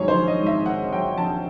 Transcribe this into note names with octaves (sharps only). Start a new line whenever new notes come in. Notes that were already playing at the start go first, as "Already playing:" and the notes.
Already playing: G#2 D#3 F#3 G#4 C#5
C5
A#1
D#5
G#2
E5
D#3 F#5
F#3 G5
A#1 A5